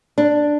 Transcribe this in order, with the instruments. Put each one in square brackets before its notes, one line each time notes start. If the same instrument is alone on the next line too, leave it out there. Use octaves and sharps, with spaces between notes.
[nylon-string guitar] D4